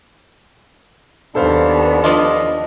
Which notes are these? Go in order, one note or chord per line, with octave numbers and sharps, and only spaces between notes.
D#2 B3 D4 A4 C5 F5
F3 D4 F4 D#5